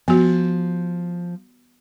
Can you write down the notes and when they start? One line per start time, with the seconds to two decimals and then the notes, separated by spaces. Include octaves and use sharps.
0.08 F3 B3 F#4